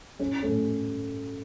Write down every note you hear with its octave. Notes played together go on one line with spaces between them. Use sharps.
C#4
A3 C#4